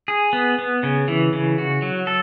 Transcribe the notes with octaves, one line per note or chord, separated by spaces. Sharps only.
G#4
B3
B3
C#3
E3
C#3
F#4
F#3
A4